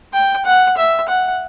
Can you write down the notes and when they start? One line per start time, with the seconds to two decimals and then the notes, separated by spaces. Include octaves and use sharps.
0.13 G5
0.45 F#5
0.77 E5
1.09 F#5